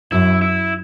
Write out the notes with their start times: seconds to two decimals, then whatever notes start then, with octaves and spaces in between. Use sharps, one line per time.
0.12 F#2 E4
0.42 E4